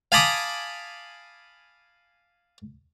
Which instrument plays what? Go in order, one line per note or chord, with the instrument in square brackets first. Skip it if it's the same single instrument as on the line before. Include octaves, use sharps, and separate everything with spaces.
[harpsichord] F5 G#5 A5 B5 D6 D#6